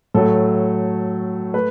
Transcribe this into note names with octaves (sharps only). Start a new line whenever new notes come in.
A2 F#3 A3 A4
A3 B4